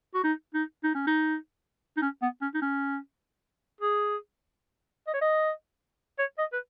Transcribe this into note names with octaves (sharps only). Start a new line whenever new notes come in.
F#4
D#4
D#4
D#4
C#4
D#4
D#4
C#4
B3
C#4
D#4
C#4
G#4
D#5
C#5
D#5
C#5
D#5
B4